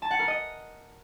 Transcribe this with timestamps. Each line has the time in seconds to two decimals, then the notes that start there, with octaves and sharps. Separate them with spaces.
0.02 A5
0.11 F#5
0.19 A#4
0.28 D#5